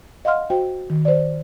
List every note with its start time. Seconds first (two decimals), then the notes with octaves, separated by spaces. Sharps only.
0.25 D#5 F5 F#5 C6 F6
0.50 F#4 C5 G5
0.90 D#3
1.05 C5 D5